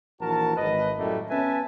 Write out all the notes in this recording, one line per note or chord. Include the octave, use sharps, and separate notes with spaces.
A#1 E3 F#4 A#4 A5
G#1 B4 D#5
F#2 A2 G3 A3 A#3
B3 C#4 B4 E5 G#5 A5